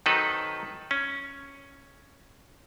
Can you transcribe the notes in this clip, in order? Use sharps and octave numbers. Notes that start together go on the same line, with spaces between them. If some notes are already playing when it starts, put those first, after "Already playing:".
D#3 F#3 C4 D#4 A4 B4
C#4